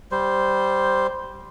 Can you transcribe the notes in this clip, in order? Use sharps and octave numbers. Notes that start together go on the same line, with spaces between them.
G3 C5